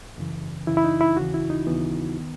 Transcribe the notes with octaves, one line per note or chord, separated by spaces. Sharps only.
F#2 C#3 E3
F#2 C#3 E3 E4
E4
D#4
E4
D#2 C#3 E3 F#4
E4
D#4
D#2 C#3 E3 B3
D#3